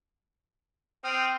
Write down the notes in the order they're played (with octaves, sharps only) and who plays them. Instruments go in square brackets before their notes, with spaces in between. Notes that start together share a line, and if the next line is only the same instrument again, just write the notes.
[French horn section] C4 [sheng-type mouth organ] G5 D#6 F6